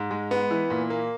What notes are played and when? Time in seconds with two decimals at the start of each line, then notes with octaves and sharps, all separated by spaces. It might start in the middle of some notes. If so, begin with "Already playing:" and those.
Already playing: G#2
0.11 G#3
0.31 B3
0.51 E3
0.70 A#2
0.90 A#3